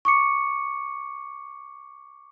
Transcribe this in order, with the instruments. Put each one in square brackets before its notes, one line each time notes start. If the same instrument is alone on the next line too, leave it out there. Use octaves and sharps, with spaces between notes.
[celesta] C#6 D6 C#7